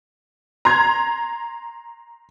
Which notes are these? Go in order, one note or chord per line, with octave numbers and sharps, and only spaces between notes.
A#5 C6 G#6